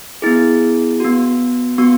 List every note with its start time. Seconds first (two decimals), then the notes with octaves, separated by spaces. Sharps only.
0.22 B3 E4 G#4
1.00 B3 F#4
1.78 B3 F#4 C#6